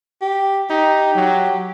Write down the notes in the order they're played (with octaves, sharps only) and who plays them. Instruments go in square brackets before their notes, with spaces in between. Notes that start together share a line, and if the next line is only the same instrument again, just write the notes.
[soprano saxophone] G4
[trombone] D#4 [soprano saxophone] G4
[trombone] F#3